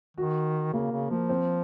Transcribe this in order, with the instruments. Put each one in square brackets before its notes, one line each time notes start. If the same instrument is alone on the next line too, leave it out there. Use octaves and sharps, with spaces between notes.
[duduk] D#3 [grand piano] F#4
[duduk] C#3 [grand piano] A#3
[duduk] C#3
[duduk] F3 [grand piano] A#3
[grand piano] C4